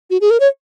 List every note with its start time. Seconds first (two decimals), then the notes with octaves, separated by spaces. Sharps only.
0.10 F#4
0.21 G#4
0.30 A#4
0.40 C#5